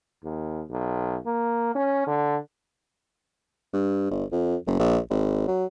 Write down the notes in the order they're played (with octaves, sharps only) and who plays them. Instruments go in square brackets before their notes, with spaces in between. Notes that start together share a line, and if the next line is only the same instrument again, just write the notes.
[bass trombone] D#2
B1
A#3
C#4
D3
[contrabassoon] G2
G1
F2
F#1
A#1
G#1
F#3